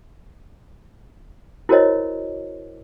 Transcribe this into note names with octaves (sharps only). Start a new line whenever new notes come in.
E4 F#4 A#4 C5 C#5 D#5